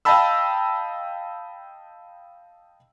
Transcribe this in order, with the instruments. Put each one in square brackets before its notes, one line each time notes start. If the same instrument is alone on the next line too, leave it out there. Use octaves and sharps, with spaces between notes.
[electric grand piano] D#5 F5 G5 A5 B5 E6